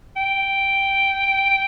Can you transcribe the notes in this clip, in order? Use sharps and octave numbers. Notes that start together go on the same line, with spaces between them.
G5